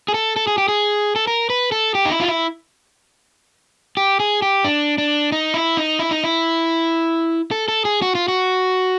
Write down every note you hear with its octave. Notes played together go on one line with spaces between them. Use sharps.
G#4
A4
A4
G#4
G4
G#4
A4
A#4
B4
A4
G4
D#4
E4
F4
E4
G4
G#4
G4
D4
D4
D#4
E4
D#4
E4
D#4
E4
A4
A4
G#4
F#4
F4
F#4